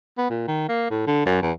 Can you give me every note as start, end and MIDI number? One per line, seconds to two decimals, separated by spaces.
0.18 0.29 59
0.30 0.44 46
0.48 0.65 51
0.69 0.86 58
0.90 1.03 45
1.07 1.25 50
1.26 1.39 42
1.42 1.52 40